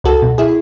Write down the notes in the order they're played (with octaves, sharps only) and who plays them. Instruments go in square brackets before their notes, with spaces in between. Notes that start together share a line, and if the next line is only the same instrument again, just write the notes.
[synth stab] C#2 F#4 A4
B2
E4 G#4